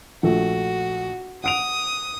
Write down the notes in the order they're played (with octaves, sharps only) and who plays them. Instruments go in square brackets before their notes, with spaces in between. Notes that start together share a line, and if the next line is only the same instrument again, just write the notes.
[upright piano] A#1 A3 [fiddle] F#4
[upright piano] F#5 D7 F7 [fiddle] D#6